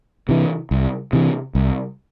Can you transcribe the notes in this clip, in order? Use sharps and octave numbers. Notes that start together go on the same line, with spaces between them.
C3 E3
C2
C3 E3
C2